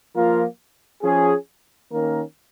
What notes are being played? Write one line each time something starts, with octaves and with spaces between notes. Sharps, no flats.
F3 A#3 F4 A#4
F3 C#4 G#4
D#3 A#3 C#4 A#4